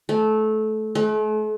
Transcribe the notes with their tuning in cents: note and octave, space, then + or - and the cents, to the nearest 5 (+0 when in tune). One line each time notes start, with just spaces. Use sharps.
A3 -20
A3 -45